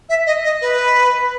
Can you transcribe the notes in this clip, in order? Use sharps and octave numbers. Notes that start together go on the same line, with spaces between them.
E5
D#5
D#5
B4